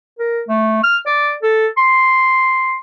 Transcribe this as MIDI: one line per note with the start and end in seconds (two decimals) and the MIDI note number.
0.19 0.41 70
0.49 0.79 57
0.83 0.97 89
1.06 1.32 74
1.43 1.67 69
1.77 2.75 84